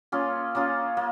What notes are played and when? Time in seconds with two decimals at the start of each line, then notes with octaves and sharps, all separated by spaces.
0.12 A#3 C#4 F4 G#4
0.55 A#3 C#4 F4 G#4
0.97 A#3